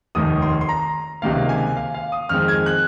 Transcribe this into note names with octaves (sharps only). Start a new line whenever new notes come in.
F1 D#2 D#3 D#6
C6
C6
A#5
C#2 C3 D#3 A#3 F5
G#5
F5
F5
D#6
F2 D#3 G#3 C4 F6
G#6
F#6